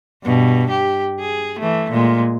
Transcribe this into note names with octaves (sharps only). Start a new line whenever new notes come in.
G2 B2
G4
G#4
E3 A3
A#2 G#3